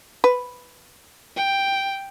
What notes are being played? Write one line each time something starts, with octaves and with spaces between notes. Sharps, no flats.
B4
G5